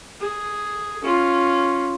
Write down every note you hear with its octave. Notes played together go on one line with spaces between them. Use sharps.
G#4
C#4 F4